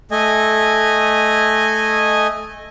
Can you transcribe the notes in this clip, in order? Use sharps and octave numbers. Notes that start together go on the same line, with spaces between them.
A3 D#5 G#5